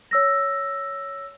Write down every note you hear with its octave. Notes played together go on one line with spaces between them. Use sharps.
C#5 E6 A#6